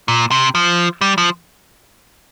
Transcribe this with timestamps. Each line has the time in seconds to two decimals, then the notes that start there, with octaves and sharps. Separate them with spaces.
0.08 A#2
0.31 C3
0.55 F3
1.01 G3
1.18 F3